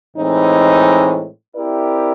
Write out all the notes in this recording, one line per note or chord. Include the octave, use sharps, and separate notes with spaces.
A2 E3 G#3 C4 D#4
C4 E4 G4 A#4 D5